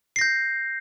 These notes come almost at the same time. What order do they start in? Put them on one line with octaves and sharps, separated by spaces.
C7 A#6 G6